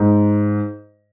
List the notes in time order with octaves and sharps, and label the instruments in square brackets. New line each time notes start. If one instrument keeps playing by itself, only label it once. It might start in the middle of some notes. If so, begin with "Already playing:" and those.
Already playing: [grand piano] G#2